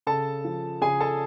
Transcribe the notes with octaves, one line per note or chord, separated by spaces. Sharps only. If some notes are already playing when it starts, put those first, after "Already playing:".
C#3 A4 A5
F3
C#3 G#4 G#5
A4 A5